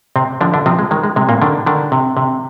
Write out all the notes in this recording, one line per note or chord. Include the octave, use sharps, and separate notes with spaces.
C3 C4
D3 F3 D4
D3 D4
C3 F3 C4
G#3
D#3 G#3
G#3
C3 G#3
A#2 A#3
D3 D#3 D4
D3 D#3 D4
C3
C3